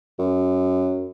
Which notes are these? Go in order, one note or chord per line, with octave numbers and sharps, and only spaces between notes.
F#2